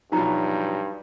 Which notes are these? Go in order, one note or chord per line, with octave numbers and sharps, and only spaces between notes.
G2 B2 F3 F#3 D#4 A#5